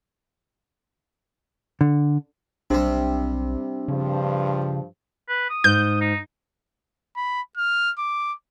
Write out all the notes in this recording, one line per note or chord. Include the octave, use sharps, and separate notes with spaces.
D3
B1 C3 G3 D4
G2 C#3 F3
B4
D#6
G#2 G6
D#4
B5
F6
D6